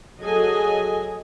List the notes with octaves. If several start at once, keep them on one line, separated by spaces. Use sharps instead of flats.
F#3 G#4 A4 D#5 G#5